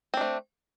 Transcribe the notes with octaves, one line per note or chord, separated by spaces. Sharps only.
A3 C4 D4